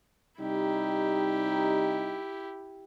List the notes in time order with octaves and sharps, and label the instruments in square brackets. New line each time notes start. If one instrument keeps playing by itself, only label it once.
[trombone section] C3 G3 D#4 [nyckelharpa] E4 G4